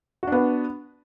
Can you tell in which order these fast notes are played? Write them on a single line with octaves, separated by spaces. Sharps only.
F#4 D4 B3